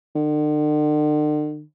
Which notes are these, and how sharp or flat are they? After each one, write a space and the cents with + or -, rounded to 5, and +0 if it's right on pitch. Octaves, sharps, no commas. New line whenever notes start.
D3 +45